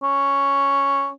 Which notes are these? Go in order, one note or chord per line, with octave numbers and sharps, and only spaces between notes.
C#4